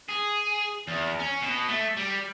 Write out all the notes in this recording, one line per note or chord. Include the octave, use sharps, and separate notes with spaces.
G#4
E2
C#4
B2
A3
G3